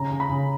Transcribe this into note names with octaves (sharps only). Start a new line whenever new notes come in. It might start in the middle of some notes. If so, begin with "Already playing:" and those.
Already playing: C#3 A#5
C#3
B5
C#3